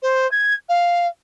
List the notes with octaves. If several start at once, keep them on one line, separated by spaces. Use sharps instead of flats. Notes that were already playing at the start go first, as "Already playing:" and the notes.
C5
G#6
F5